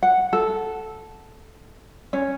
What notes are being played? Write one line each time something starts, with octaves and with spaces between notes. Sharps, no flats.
F#5
A4
C#4